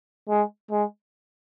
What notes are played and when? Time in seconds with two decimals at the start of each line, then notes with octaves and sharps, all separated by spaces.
0.29 G#3
0.71 G#3